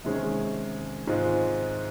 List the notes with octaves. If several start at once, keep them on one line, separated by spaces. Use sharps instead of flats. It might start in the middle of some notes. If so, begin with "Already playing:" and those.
C3 D#3 G#3 C#4 G#4
G#2 D#3 G#3 C4 F4